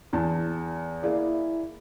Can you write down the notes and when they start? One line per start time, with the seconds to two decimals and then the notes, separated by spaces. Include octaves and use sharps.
0.13 E2 A5
1.03 A#3 E4 G#4 D5